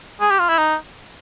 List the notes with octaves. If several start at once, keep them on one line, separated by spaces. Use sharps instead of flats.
G#4
G4
F4
E4
D#4